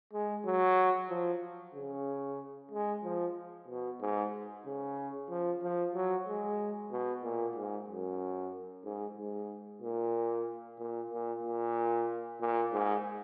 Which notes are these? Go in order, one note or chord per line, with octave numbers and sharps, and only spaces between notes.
G#3
F#3
F3
C#3
G#3
F3
B2
G#2
C#3
F3
F3
F#3
G#3
B2
A#2
G#2
F#2
G#2
G#2
A#2
A#2
A#2
A#2
A#2
G#2